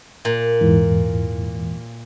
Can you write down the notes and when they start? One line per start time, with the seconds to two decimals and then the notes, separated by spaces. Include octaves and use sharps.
0.25 A#2
0.61 E2 G#2 E3